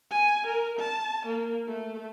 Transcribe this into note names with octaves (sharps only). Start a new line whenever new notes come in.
G#5
A#4
A5
A#3
A3